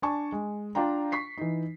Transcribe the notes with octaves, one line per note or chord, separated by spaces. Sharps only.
D4 D5 G#5 A5 C#6
G#3
D4 F4 G5 A#5
C#6 B6 C7
E3 D#4